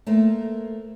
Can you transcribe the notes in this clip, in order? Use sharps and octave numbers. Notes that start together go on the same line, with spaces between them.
A3 A#3 A#4 C5